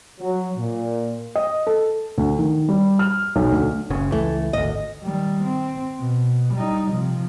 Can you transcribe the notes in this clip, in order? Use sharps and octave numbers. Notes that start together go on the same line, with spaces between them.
F#3
A#2
D#5
A4
D2
D#3
G3
F6
B1
D2
F#1 C#3
C#2 E3 A3
G#1 D2 D#5
D#3 G3
C4
B2
G3 D#4
C3 F3